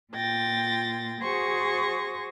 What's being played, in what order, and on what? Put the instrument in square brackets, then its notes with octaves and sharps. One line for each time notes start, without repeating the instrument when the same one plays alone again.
[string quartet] A#2 F4 G5 A6 A#6
F#4 G#4 C5 G#5 C#6 A#6